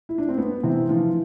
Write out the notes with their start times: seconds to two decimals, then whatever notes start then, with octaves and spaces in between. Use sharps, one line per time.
0.09 E4
0.18 D4
0.29 C4
0.38 G2 B3
0.63 C3 E3 C4
0.89 E3 F3 F4